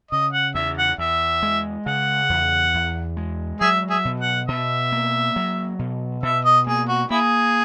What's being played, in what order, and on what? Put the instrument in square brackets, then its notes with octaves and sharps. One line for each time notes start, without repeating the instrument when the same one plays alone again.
[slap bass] C#3 [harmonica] D#5
[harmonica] F#5
[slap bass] E2 [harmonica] E5
[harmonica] F#5
[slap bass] E2 [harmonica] E5
[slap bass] G#3
[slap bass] C#3 [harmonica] F#5
[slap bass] E2
E2
G#3
[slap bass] F#3 [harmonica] G#4 E5
[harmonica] G#4 E5
[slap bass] B2
[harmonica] F#5
[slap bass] B2 [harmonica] E5
[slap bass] A#3
F#3
B2
[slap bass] B2 [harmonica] E5
[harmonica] D#5
[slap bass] A#3 [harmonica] G#4
[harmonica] F#4
[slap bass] A#3 [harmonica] E4 G#4